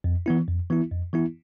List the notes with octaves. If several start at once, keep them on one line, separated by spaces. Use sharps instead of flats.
F2
E3 B3 E4
F2
E3 B3 E4
F2
E3 B3 E4